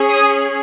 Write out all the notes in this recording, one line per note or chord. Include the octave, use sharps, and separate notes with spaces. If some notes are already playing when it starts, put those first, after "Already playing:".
Already playing: C#4 G#4
D#6